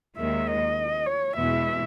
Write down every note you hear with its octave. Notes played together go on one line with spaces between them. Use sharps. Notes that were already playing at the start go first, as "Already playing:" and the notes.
D#2 D#3 G#3 E5
D#5
C#5
E2 B2 G#3 B3 E4 E5